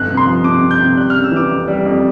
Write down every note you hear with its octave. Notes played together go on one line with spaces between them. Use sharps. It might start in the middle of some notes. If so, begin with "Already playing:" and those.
Already playing: G1 F2 F#6
C3
C6
F3
C3 D6
F2
G6
C3
G3 F#6
F6
C#3
E6
E3 D6
F2
G3
F2